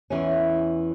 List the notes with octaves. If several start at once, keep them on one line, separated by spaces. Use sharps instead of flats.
E2 E3 C#4